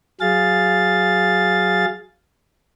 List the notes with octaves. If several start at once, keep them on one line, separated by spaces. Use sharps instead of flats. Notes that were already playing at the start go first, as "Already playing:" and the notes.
F#3 G#4 F5 A6